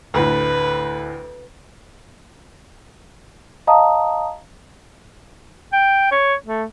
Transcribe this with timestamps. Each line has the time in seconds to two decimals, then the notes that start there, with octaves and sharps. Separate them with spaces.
0.14 D2 A2 B4
3.67 D#5 F5 A5 A#5 D#6
5.73 G5
6.12 C#5
6.46 A3